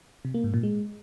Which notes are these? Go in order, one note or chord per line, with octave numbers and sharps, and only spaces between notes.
C3
A#3
G#2
A#2
G#3